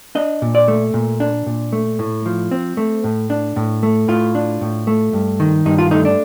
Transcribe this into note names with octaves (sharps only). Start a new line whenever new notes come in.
D4 D#5
A#2
D5
A3
A#2
D4
A#2
A3
A2
F3
C4
A3
A2
D4
A2
A3
A2 F4
D4
A2
A3
G2
D#3
G2 D#4
F4
A3 D#4
D4